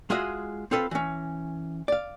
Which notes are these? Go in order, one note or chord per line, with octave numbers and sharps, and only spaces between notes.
G#3 F4 F#4 G#4 D#5 E5
C4 F4 A4 B4
E3 C#4
D5 F5